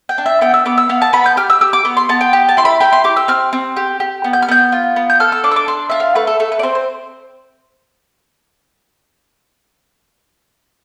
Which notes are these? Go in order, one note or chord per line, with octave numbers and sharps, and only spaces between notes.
G5
D4
E5
B3 G5
E6
B3 D6
E6
B3 F5
A5
B3 B5
G6
G4 F6
E6
G4 E6
D6
B3
C6
B3 A5
G5
G4
A5
E4 C6
B5
G4 B5
C6
G4 D6
E6
C4 F6
C4
G4
G4
B3
G6
F6
B3 G6
F4
B3
G6
A4 F6
E6
D4 D6
E6
D6
D4 C6
F4 E5
F5
A3 B4
A4
A3 A4
B4
D5
C4 C5
C5